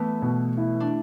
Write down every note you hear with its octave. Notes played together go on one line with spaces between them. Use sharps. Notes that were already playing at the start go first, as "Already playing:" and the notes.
Already playing: E3 A3 B3
B2
E4
D4